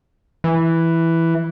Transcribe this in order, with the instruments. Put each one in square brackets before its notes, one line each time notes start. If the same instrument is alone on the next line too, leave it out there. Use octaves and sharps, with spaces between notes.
[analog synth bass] E3